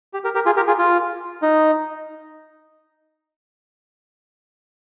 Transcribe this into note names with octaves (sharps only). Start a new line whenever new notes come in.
G4
G4 A#4
G4 A#4
F4 G#4
G4 A#4
F4 G#4
F4
D#4